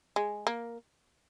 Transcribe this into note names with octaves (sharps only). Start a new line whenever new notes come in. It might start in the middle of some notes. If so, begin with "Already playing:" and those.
G#3
A#3